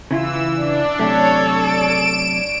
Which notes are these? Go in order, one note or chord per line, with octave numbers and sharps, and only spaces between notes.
C#3 E3 E4 F4 E6
D4 D5
F#2 C3 A3 A4 C#5
D7 E7